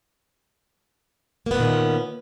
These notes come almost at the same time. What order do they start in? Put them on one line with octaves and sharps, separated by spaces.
A#3 B3 A#2 D#3 C#4